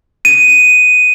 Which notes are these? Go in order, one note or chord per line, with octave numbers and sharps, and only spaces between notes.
D#7